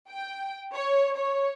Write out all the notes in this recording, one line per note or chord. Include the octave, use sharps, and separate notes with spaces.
G5
C#5
C#5